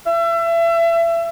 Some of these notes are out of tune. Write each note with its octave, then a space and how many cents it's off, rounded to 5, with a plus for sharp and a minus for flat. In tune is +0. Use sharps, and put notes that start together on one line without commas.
E5 +30